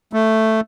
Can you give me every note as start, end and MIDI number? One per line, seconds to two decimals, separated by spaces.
0.13 0.61 57